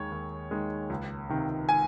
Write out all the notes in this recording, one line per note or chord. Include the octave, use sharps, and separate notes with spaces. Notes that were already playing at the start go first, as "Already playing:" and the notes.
Already playing: D#2 D#3 G#3 C#5
D#2
D#3 G#3
C#2
C3 D#3
G#5